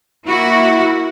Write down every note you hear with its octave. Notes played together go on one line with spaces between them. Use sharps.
A#3 E4 F#4